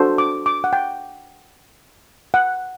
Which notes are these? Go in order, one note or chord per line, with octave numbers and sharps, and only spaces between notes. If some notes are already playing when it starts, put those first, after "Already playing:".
Already playing: D4 F#4 A4 C5
D6
D6
F#5
G5
F#5